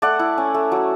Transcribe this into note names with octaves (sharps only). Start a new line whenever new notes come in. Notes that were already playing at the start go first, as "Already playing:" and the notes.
A3 D5 F#5
E4
C#4
A3
F#3